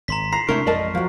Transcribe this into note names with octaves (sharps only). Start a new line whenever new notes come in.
G#1 A#5 C6 B6
A#5 C7
C3 G#3 A3 D4 E4 A#4 C#6
A1 F2 G#3 A#4 D5 D#5 A5
F3 F#3